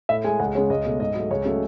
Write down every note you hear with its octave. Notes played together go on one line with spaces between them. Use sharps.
A2 E5
G#3 G#5
C#2 F#5
C#3 G#3 C#5
C#2 D#5
B2 A3
G#2 D#5
F#3 A3
C#2 C#5
C#3 F#3 A3